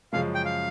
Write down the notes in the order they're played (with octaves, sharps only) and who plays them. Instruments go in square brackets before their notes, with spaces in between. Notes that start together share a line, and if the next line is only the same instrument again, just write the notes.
[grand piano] F#2 C#3 F3 G#3 [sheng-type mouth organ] F5
[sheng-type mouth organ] G5
F5